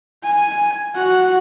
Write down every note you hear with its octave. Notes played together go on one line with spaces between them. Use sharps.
G#5
F#4 F#5